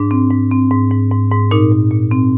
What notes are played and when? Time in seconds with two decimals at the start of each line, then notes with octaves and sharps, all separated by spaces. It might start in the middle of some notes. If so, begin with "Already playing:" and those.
Already playing: G#2 D4
0.11 C4
0.31 G#2
0.51 C4
0.71 G#2
0.91 G#2
1.11 G#2
1.31 G#2
1.51 A#2 D#4
1.72 A#2
1.91 A#2
2.12 C4